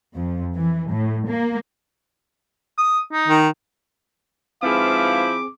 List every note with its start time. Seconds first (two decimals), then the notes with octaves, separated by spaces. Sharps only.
0.16 F2
0.55 E3
0.91 A2
1.28 A#3
2.78 D#6
3.13 D#4
3.28 D#3
4.63 G#2 F3 C4 E4 G#4 B4 F5 D6